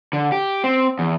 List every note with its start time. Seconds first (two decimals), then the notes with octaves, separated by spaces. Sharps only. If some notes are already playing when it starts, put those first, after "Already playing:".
0.13 D3
0.32 G4
0.64 C4
0.99 E2